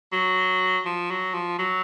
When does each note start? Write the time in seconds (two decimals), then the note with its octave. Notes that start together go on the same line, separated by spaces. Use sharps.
0.12 F#3
0.85 F3
1.10 F#3
1.34 F3
1.59 F#3